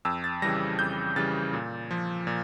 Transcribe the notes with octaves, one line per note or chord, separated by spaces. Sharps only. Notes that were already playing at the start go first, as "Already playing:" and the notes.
F2 E6
A6
C#3 E3 G3 A#6
F2 G6
C#3 E3 G3 A6
A#2
F3
A#2